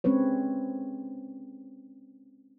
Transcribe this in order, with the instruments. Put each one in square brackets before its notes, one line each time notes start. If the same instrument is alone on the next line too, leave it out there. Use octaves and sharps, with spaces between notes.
[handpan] G#3 C4 C#4 B4 C#5